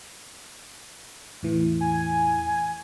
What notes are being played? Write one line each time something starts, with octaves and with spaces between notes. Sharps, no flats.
E2 A2 E3
G#5